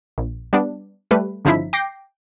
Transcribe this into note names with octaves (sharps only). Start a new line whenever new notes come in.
A#1
G3 B3 D4
G3 A3 B4
G1 C#3 F3 D#4 E4 B6
G5 D6 A#6 C7